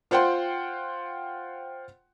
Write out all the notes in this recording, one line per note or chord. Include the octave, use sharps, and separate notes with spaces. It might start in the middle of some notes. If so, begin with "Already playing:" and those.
F4 C5 F#5 G5 C6